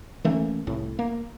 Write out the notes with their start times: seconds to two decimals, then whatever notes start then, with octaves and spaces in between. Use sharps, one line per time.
0.25 E3 A3 A#3 C#4
0.67 C2 A2
0.99 A#3